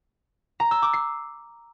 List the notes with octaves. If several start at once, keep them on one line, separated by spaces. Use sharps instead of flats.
A#5
E6
D6
C7